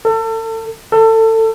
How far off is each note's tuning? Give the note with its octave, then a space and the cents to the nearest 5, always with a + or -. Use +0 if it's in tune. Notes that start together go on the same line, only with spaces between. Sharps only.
A4 +35
A4 +25